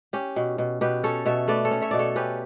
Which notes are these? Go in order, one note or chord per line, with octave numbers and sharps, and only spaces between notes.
C#4 G4
B2
B2
B2 G4 B4
C#4 A4 C#5
B2 C#5 E5
A3 B4 D5
A4 C#5
C#4
C#5 E5
B2 D5
A4 C#5
C#4 G4 B4